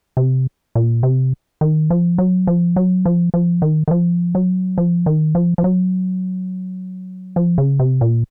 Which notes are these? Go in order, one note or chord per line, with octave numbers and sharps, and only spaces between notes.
C3
A#2
C3
D#3
F3
F#3
F3
F#3
F3
F3
D#3
D#3
F3
F#3
F3
D#3
F3
F3
F#3
F3
C#3
C3
A#2